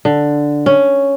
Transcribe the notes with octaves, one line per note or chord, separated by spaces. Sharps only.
D3
C#4